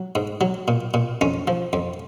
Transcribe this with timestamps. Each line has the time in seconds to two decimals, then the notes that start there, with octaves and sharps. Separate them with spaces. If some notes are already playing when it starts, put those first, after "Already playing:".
Already playing: F#3
0.15 G#2
0.41 F#3
0.68 A#2
0.94 A#2
1.21 F2 C#4
1.48 F3
1.73 F2